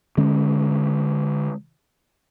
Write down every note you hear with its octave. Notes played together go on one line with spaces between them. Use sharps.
D3 G#3 C#4